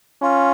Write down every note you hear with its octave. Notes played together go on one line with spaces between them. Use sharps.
C#4 F4